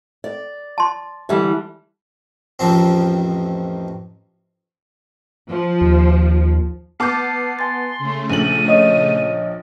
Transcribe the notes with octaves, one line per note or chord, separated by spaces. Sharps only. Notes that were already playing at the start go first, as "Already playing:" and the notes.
D5
A5 C6
D3 E3 G3
A1 F2 D#3 F3 C4
F3
D#2
B3 A5 D6 F6 G6 C7
G#5 C6 A6
C#3 A3
A#1 D#7 F#7
C#5 D#5 D#6